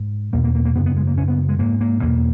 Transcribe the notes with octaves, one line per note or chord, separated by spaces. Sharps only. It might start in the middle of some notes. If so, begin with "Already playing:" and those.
Already playing: G#2
E2 B2 A#3
A#3
A#3
A#3
F#2 C#3 B3
B3
G#3
A#3
F#2 C#3 C#4
B3
G#3
G#2 A#3
A#3
E2 B2 A#3